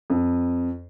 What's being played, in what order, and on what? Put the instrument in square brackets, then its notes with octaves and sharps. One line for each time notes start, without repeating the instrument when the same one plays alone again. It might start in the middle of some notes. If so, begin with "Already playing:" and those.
[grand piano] F2